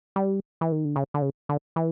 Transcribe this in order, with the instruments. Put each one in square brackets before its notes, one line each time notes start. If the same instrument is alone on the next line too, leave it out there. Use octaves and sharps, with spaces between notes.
[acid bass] G3
E3
D#3
D3
C#3
D3
C#3
D3
E3